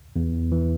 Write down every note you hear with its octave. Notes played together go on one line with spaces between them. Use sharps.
E2
E3